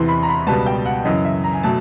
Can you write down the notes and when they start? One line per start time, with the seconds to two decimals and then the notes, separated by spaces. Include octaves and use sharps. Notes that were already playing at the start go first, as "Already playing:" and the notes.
Already playing: E2 C3 E3 C6
0.08 B5
0.23 A#5
0.29 B5
0.47 C#2 B2 G3 B3 A5
0.66 G5
0.86 F#5
1.05 F#2 C#3 E3 D#5
1.25 E5
1.44 A#5
1.53 G#5
1.63 B2 F#3 A3 A5